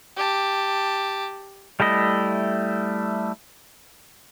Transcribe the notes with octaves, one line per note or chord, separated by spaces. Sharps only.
G4 A5
G3 A3 E4 D#5